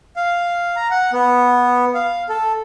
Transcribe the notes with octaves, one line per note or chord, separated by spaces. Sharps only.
F5
A#5
F#5
B3
F5
A4